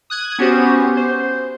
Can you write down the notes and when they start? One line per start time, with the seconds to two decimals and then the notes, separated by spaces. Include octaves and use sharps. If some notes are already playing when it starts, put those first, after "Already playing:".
0.10 D#6 F#6 G#6
0.39 B3 C#4 F#4 G4 C5
0.97 C5